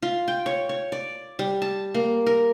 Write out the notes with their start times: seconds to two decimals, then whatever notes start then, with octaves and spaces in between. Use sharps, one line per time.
0.02 F4
0.28 G5
0.46 C#5
0.69 C#5
0.92 D5
1.39 G3
1.62 A5
1.94 A#3
2.26 A#4